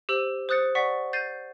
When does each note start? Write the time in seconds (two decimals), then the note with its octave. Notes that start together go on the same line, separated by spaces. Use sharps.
0.09 G4 C5 E6 F#7
0.49 C5 D#6 F#6 A6 C#7
0.75 D5 F#5 C#6 A6 B6
1.13 G6 A6 C7 D#7